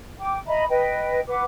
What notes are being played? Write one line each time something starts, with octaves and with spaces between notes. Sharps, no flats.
G5 D6
D#5 E5 A#5 B5
B4 D#5 G5
B4 F#5 D6